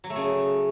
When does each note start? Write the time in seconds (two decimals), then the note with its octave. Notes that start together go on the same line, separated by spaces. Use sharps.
0.04 F#3
0.10 A3
0.16 C#3